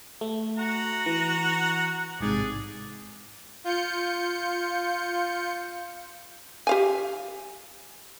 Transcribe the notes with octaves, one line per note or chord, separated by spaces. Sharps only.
A3
F#4 F#5 A#5
E3
A1 G#2 C3 G#4 D5
F4 G6 C#7
G4 F5 G#5